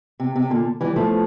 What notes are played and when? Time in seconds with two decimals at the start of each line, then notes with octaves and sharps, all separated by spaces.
0.20 C3
0.36 C3
0.50 A#2 D3
0.81 E3 G3
0.96 F3 A3